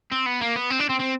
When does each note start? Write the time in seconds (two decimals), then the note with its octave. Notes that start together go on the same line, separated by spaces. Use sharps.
0.12 C4
0.26 B3
0.41 A#3
0.56 B3
0.70 C4
0.79 D4
0.89 C4
0.99 C4